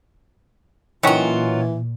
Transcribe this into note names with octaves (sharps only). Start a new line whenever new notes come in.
A#2 D#3 E3 F#3 C#4 F4 F#5